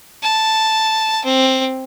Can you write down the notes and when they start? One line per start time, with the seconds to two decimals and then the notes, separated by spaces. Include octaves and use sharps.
0.23 A5
1.25 C4